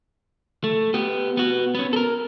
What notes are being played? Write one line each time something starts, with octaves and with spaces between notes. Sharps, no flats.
A3
B3 G4
B3 F#4
B3 C#4
A4 A#4